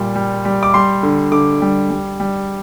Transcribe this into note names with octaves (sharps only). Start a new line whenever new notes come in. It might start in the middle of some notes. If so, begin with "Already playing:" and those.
Already playing: A#2 G3
G3
G3
D6
G3 C6
D3
D3 D6
G3
G3
G3